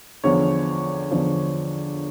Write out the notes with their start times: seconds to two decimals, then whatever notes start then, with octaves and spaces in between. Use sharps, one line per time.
0.24 E2 D3 F3 C#5
1.11 E2 D3 F3